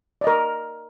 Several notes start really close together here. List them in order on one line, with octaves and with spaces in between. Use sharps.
D5 D#5 A#4